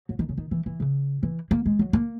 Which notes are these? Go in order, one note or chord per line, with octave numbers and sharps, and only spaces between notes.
F#3
D#3
C#3
D#3
E3
E3
C#3
E3
A#3
G#3
F#3
A#3